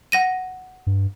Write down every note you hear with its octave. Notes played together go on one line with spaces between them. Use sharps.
F#5 A#6 D#7
G2